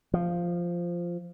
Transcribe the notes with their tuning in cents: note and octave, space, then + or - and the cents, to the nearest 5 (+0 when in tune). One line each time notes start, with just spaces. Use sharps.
F3 -5